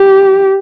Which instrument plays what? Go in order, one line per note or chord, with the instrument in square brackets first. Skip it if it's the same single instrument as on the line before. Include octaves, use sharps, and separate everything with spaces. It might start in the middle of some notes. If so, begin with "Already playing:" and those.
Already playing: [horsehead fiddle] G4